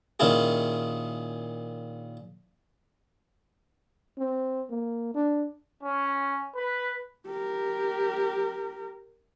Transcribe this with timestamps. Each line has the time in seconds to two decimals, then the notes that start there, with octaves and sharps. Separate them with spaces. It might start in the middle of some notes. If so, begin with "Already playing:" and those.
0.20 A#2 D#3 C#4 E4 F4 G#4
4.18 C4
4.70 A#3
5.14 D4
5.83 C#4
6.56 B4
7.27 G4 A#4